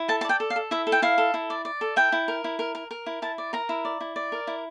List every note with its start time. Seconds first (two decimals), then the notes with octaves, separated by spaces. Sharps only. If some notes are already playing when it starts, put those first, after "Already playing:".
Already playing: E4
0.08 A4 A5
0.21 A5
0.25 D5 G5
0.40 A4
0.50 F5
0.56 A4
0.71 E4 E5
0.87 A4
0.92 G5
1.02 E4 F5
1.18 A4
1.34 E4
1.50 D5
1.65 D5
1.81 A4
1.96 E4 G5
2.12 E4
2.28 A#4
2.44 E4
2.59 A#4
2.75 A#4
2.91 A#4
3.06 E4
3.22 E4 A5
3.38 D5
3.53 A#4 A#5
3.69 E4
3.85 D5
4.01 E4
4.16 D5
4.32 A#4
4.47 E4